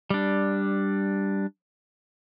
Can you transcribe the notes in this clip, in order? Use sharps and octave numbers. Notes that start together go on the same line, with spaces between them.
G3 D4